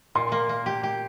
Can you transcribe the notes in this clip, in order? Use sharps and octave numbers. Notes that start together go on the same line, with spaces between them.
A#2 C6
A#3
A#3
G4
G4